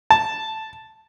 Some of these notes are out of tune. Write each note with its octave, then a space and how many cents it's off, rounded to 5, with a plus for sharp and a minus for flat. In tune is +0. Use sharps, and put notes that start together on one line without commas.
A5 +0